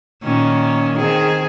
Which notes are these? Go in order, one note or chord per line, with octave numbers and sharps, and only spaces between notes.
A#2 D#3 C#4
D#3 C4 G#4